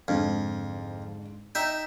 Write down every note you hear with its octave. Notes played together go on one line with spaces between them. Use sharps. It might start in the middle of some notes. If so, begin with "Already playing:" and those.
F2 G#2 D3
D#4 E5 G5